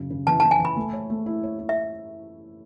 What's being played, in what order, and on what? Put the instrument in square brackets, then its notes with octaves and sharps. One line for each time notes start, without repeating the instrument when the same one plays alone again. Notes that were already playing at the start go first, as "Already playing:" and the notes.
Already playing: [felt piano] F#2 C#3
C#3
[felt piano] E3 [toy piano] A5
[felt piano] E3 [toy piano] A5
[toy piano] G#5
[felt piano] E3
[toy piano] B5
[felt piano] A3
C#5
A3
E4
C#5
E4
[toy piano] E5